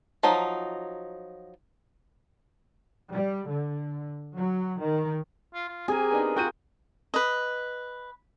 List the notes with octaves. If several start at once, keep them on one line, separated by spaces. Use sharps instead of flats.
F3 F#3 D#4
G3
D3
F#3
D#3
F4
F4
C4 G4 G#4 A#4 G#5
B3 D4 D#4
F4 F#4 A#4 G5 G6 D#7
B4 D#5